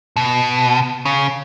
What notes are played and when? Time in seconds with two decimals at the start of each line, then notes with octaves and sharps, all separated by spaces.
0.16 B2
1.05 C#3